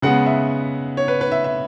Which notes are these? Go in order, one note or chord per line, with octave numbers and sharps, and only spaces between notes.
C#3 G#3 B3 F#5
E5
C#5
B4
B4
E5
E5